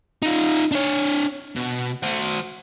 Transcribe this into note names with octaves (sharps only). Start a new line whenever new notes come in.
D#4 F4
D4 C#5
B2
F#4 C5